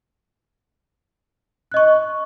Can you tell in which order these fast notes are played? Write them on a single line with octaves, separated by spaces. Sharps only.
F#6 D#5 C#6